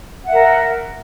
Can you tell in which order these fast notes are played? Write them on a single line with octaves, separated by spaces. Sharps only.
F#5 E5 A#4